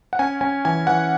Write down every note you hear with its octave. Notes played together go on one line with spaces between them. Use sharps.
F#5
C#4 G#5
C#4 G#5
E3 G#5
E3 F#5